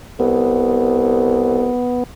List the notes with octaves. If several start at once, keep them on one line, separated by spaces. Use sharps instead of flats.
C2 B3